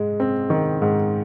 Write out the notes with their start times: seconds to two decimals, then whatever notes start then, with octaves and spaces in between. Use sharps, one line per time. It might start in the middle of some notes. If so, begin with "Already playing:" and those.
Already playing: G#2 G#3
0.20 C4
0.50 D#3
0.82 G#2